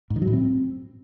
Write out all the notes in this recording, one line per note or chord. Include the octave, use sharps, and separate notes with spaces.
G#2
D#3
F#3
A2
C4